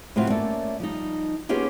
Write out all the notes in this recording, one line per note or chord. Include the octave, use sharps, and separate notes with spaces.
A2 C3 F#3 C4 F4 F#4
A3 A#3 C#4 D5 A5
F3 G3 D#4
A#3 B3 C#4 F4 G4 G#4